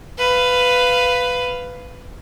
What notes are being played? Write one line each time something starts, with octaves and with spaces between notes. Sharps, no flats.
B4 F5